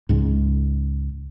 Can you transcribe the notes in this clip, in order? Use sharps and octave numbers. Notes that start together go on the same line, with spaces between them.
C#2 G#2